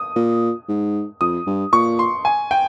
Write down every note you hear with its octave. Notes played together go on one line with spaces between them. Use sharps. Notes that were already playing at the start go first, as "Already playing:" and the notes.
Already playing: D#6
A#2
G#2
F2 D#6
G2
A#2 C#6
C6
G#5
G5